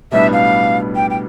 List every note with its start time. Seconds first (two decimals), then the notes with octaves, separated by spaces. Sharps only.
0.12 B1 A2 G3 B3 D4 E5
0.33 F5
0.96 G5
1.10 G5